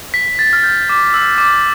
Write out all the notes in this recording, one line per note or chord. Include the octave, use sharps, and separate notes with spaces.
B6
A6
F6
G6
D6
E6
D6